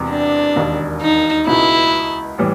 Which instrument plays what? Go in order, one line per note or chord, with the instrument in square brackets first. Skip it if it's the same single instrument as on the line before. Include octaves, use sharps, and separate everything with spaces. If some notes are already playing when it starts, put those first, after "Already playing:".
Already playing: [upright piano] E1 E2 C3
[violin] D4
[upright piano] E1 D#2 D#3
[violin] D#4
[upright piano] C#2 B2 G#3 [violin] E4
[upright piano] A2 E3 G3